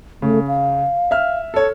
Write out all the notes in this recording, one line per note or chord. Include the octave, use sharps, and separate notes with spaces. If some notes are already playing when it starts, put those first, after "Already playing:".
C#3 A3
F5
E5 F6
A4 C#5